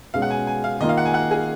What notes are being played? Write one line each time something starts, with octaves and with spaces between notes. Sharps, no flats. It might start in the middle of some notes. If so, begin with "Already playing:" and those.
B2 G#3 C#4 F5
F#5
G#5
G#5
F5
D#3 A#3 F4 D#5
F5
F#5
G#5
F#5
G#4